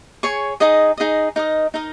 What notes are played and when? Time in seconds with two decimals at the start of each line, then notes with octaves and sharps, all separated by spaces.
0.23 G#4 C#5 G#5 C#6
0.60 D#4 G#4 D#5
0.97 D#4 G#4 D#5
1.36 D#4 A#4 D#5
1.74 D#4 A#4 D#5